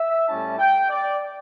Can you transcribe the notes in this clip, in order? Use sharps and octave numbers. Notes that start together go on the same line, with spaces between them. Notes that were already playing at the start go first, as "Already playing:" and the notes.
Already playing: E5
A2 G3 C#4 E4 A5
G5
D5